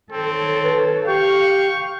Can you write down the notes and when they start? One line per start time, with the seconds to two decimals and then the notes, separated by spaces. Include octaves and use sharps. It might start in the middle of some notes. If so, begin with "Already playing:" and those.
0.12 D#3 C4 A4 C#5
0.64 B4
1.07 G4 F5 G5 C#6